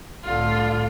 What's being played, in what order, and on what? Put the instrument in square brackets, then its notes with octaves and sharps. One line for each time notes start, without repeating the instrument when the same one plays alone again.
[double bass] C2 A2 [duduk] D3 [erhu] F4